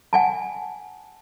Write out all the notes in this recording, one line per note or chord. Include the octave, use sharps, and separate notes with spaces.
F#5 G#5 A5